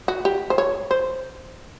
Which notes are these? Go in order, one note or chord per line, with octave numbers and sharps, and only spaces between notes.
F#4
G4
C5
C#5
C5